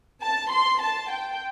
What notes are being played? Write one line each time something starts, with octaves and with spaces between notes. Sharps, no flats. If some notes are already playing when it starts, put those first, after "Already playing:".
A5
C6
A5
G5